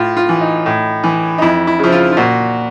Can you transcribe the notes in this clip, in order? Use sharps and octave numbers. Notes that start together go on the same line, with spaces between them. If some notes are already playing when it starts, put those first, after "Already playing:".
Already playing: A2 F4
F4
E3
D#4
A2
E3
D#4
F2 E4
E4
C#3 F3 E4
F4
F4
A#2 F#4